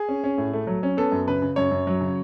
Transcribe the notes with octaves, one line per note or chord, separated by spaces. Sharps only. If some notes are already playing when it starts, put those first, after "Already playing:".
Already playing: G#4
C#4
C#4
A2
A3
F#3
C#4
B3 A4
F#2
C#3 B4
C#3
F#2 C#5
F#2
F#3
C#3